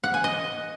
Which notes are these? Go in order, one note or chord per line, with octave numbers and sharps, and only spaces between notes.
F#5
G#5
D#5